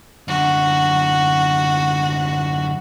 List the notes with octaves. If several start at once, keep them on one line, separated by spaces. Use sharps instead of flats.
F#2 D3 F#4